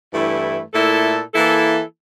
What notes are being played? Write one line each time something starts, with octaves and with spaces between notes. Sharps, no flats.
G2 E3 A3 E4
A#2 A3 E4 A4
E3 A#3 E4 A4